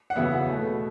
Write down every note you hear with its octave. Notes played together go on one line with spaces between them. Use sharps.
F#5
E2 C#3 F#3 B3 E5
B2 A3